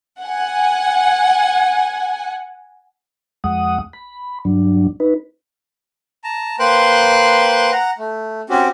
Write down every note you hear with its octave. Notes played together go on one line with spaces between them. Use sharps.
F#5 G#5
F2 G#3 F#5 D#6
B5
G2 F#3 D4
D#4 B4
A5 A#5
A#3 B4 C5 G5 C6 F#6
F#5 A#5
A3
C4 C#4 F#4 G4